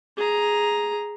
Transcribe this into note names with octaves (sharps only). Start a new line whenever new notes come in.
G#4 A#5